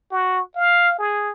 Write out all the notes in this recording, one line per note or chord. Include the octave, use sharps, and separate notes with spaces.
F#4
F5
G#4